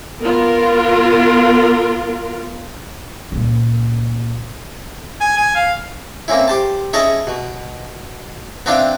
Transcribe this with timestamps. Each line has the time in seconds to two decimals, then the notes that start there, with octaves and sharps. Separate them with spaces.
0.22 B3 F4 A#4
3.32 C#2 A#2
5.21 G#5
5.38 G#5
5.55 F5
6.28 A#3 C4 C#4 E4
6.48 G4 C5 A5
6.93 C#4 E4 G#4 C#5 D#5 A5
7.27 B2
8.66 B3 C4 D4 E4 F5 G5